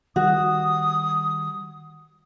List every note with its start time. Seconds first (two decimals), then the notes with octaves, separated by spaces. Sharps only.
0.16 D#3 G3 F#4 D#6